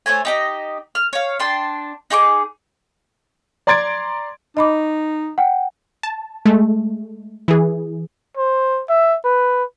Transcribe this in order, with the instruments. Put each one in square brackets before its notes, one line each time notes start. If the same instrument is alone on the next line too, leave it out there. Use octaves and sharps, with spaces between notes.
[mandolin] A3 C5 C#5 G#5
D#4 G4 D#5
F6
C#5 F5
D4 G5 A5 C6
D#4 G#4 C#6 D6
[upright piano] D5 A#5 C6 G#6 A6 D7
[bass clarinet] D#4 [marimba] D#5 B5 D6
[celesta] F#5 G5
[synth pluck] A5
G#3 A3
E3 G#4
[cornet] C5
E5
B4